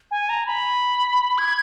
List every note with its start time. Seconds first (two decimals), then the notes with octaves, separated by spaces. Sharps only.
0.11 G#5
0.29 A#5
0.46 B5
1.38 G#6